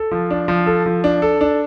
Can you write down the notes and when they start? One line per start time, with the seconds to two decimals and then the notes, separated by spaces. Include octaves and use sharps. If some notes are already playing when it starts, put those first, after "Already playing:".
Already playing: A4
0.11 F3
0.30 D4
0.48 F3
0.66 A4
0.86 F3
1.04 D4
1.22 A4
1.41 D4